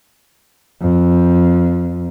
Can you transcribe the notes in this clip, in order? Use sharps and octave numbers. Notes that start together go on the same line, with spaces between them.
F2